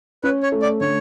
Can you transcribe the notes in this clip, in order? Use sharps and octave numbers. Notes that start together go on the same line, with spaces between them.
C#4 B4
C#5
A3
D5
D3 C#5